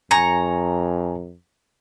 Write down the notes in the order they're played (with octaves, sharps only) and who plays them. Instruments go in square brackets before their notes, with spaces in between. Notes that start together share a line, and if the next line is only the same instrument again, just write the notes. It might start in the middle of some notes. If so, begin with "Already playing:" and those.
[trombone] F2 [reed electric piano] G#5 [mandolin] A#5 C#6